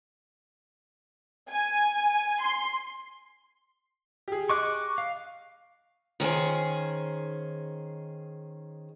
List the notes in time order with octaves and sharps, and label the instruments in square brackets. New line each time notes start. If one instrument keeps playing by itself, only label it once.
[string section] G#5
C6
[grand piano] G4 G#4
[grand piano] D#5 [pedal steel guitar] C#6 D6 F#6
[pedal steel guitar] F5
[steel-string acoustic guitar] D#3 C#4 G#4 C5